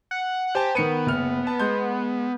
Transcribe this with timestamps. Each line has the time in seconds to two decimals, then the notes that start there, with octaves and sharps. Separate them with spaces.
0.11 F#5
0.55 G4 C5 G#5 A5
0.75 D#3 B3 C#7 D#7
1.06 F#1 F6
1.47 A5
1.59 G#3 C6 G6